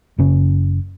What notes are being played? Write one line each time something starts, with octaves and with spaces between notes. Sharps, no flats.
F#1 C#3